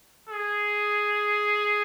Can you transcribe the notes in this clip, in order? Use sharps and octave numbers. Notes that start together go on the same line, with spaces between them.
G#4